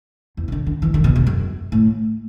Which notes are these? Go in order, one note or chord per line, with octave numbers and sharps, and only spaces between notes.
E2
C#3
D3
D3
E3
D3
B2
E2
F#2
A2